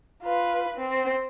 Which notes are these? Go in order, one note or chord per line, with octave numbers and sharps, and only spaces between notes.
F4 B4
C4